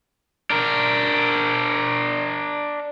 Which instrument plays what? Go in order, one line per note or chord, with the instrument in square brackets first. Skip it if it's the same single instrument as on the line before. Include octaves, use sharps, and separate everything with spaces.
[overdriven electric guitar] D4 A#4